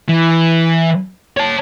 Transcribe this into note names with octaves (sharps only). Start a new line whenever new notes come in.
E3
C#5 A5